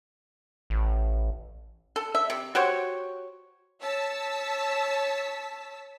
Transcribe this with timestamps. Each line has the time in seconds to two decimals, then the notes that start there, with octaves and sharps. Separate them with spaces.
0.70 A1
1.96 A4
2.15 E5
2.30 C3
2.55 F#4 G4 C5 C#5
3.82 C#5 A5 E6 B6